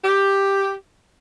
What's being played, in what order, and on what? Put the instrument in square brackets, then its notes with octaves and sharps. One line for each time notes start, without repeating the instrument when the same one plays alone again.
[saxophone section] G4